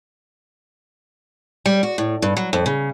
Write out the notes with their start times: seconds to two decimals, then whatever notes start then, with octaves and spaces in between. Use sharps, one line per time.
1.66 G3
1.83 F#4
1.98 A2
2.22 G2
2.37 F#3
2.53 F2
2.66 C#3